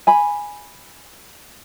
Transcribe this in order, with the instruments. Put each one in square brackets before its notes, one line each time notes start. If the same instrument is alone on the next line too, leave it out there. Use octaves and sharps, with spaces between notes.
[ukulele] G#5 B5